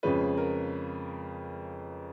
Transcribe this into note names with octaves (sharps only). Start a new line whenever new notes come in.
F2 C#3 F3 G#3 C#4 B4
A#4